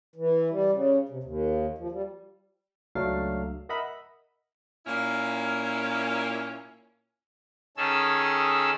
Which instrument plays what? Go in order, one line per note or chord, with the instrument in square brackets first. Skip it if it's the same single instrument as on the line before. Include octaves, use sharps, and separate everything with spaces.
[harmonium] E3
G3
C#3
C3
D#2
F3
G3
[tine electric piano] C#2 F#3 A3 D4 F5
A#4 D#5 E5 F#5 B5
[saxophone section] A#2 A#3 C#4 E4
[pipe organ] D#3 C#4 G#4 A4 E6